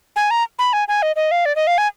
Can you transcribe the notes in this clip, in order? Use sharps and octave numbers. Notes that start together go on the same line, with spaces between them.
G#5
A#5
B5
G#5
G#5
D#5
D#5
F5
D5
D#5
F5
G#5